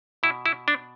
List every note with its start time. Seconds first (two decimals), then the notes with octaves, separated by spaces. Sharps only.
0.23 B2 E4
0.46 E4
0.68 D4